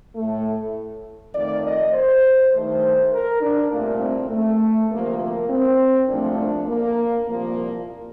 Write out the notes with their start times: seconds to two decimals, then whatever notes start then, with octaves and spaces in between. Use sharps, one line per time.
0.15 A2 A3
1.34 F2 D#3 A3 D5
1.64 D#5
1.93 C5
2.52 G2 D#3 A3 C5
3.12 A#4
3.41 D4
3.71 C2 A#2 A3 A#3
4.00 C4
4.30 A3
4.89 D2 C3 F3 A3 A#3
5.19 A#3
5.49 C4
6.08 C2 A#2 F3 A3 D4
6.37 D4
6.67 A#3
7.27 C2 A#2 F3 A#3